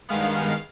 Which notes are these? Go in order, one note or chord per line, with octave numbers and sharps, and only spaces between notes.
G2 D#3 G#3 B3 F5